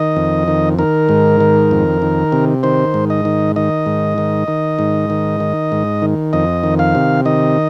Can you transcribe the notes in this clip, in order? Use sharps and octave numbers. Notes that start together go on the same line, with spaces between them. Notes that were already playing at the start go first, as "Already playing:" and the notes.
Already playing: D#3 D#5
F2
D#3
D#3 A#4
G#2
D#3
F2
D#3
C3
D#3 C5
G#2
D#5
D#3
D#3 D#5
G#2
D#3
D#3
G#2
D#3
D#3
G#2
D#3
F2 D#5
D#3
F5
C3
D#3 D#5